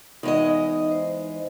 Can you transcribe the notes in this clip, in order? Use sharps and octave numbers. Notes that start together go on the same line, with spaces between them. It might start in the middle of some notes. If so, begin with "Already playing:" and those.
E2 G#3 D#4 D#5
C5